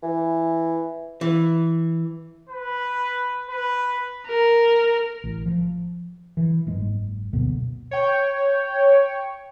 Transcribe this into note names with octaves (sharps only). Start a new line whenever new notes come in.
E3
E3
B4
B4
A#4
A1
F3
E3
F#1 G#2 G#3
F#1 D2 B2 B3
C#5 G5